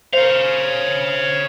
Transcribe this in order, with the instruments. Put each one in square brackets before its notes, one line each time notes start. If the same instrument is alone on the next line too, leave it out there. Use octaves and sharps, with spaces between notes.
[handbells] A#4 C5 [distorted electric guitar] C#5 F5